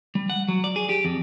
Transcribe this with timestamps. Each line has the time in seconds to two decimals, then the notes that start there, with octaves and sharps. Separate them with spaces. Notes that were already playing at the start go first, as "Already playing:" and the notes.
0.15 G3
0.30 F#5
0.48 F#3
0.64 D5
0.76 G#4
0.89 G4
1.05 F2